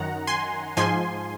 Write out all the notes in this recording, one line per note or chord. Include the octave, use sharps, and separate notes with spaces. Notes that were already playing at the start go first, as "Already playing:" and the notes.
Already playing: F#2 D#3 F#5 A#5
G#5 C6
G#2 F3 G#5 C6